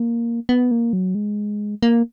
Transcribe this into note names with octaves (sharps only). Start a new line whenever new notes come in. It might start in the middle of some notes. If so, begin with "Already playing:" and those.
Already playing: A#3
B3
A#3
F#3
G#3
A#3